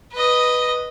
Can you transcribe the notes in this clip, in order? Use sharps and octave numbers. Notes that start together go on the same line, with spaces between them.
B4 D#5